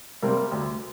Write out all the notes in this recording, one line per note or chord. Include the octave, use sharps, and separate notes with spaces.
C3 G3 A#3
D2